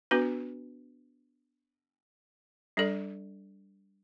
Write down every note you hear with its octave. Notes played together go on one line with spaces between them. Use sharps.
B3 D4 F#4 B4
G3 D4 A4 D5